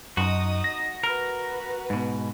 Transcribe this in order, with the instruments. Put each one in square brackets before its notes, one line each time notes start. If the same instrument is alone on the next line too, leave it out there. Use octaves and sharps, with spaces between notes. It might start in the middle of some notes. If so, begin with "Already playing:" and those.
[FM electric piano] F#2 [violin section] D#4 D#6 [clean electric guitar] F#4
[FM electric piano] A#6
[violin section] F#4 B4 [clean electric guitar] A#4
[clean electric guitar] G#2 B2